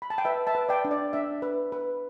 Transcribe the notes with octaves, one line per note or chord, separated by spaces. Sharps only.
B5
A5
G5
B4 E5
E5 A5
B4
D5 G5
D4
D5
D4 E5
B4
B4